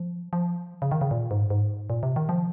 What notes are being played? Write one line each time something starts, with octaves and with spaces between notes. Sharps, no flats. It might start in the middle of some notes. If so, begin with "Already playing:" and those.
Already playing: F3
F3
C#3
D#3
C#3
A#2
G#2
G#2
A#2
C3
D#3
F3